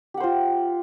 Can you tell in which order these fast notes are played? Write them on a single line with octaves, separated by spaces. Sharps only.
G4 F#5 C5 F4